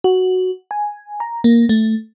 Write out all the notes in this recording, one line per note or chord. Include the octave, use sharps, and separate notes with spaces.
F#4
G#5
A#5
A#3
A3